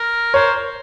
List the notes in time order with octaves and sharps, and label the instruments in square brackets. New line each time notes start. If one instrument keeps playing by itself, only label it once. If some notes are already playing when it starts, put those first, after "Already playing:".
Already playing: [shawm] A#4
[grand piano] A#4 C#5 [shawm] C5